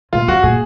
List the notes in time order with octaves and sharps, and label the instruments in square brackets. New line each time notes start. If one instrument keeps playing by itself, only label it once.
[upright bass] A#2 [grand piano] F4
[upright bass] F#2 [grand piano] F#4
[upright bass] A#2 [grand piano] G#4